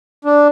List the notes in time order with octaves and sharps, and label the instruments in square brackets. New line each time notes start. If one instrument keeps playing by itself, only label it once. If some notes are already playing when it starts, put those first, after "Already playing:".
[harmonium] D4